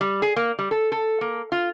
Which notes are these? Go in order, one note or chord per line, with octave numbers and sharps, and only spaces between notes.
G3
G#4
A#3
G3
A4
A4
A#3
F4